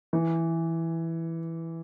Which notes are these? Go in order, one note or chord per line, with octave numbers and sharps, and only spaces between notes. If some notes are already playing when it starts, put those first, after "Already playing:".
E3